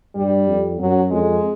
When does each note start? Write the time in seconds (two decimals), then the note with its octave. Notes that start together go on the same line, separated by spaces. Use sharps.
0.15 G2 G3
0.47 F2
0.79 F#2 F#3
1.11 F2 G#3